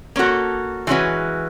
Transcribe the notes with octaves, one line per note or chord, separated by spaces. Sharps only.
A#3 C#4 F#4 A4
E3 G#3 C#4 F#4 B4